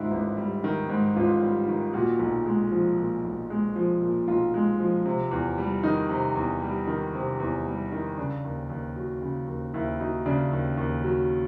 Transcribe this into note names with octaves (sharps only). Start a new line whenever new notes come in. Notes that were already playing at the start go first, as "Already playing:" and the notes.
Already playing: G#2 D#3 G3 E4 F4
A1
G3
D#3
G#2
A1 F4
G3
D#3
A#2 F#4
B1
G#3
F3
A#2
B1
G#3
F3
A#2
B1 F4
G#3
F3
C3
E2
G3
D#3 D#4
C3
E2
G3
D#3
C3
E2
G3
D#3
C#3 D4
D#2
D#2
F#3
C#3
D#2
D#2 E4
F#3 D#4
C#3 D4
D#2
D#2
F#3